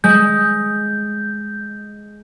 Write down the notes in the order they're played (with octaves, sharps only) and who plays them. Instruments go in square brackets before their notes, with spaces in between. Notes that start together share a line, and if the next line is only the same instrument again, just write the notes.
[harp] G#3 [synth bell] G6